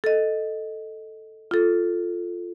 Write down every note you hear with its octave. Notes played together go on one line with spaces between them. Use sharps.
A4 D#5
F4 A4